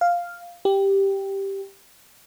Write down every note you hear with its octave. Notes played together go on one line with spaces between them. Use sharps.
F5
G4